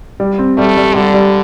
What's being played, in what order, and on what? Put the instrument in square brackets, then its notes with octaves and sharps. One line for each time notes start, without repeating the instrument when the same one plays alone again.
[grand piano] G3
C4
[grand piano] G3 [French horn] A3
[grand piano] G3
[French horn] D3 [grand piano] G3
[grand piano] G3